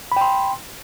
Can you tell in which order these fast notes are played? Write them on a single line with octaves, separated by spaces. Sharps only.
B5 G5 C6